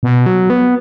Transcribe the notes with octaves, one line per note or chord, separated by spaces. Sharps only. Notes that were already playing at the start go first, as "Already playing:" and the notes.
B2
F#3
B3